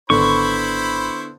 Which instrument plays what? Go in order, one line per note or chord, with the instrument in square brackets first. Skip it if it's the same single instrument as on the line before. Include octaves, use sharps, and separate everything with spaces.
[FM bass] G#1 [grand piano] D3 B3 [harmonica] E4 C5 B5 [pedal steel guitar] C#6